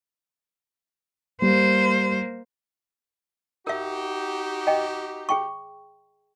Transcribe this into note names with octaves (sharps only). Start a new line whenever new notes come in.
G3 A#3 C5
D#4 F#4 G4 A#4 E5
D#5 G5
G#4 G5 C#6